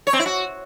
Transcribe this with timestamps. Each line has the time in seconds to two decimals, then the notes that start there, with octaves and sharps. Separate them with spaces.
0.07 C#5
0.13 C4
0.19 E4
0.26 F#4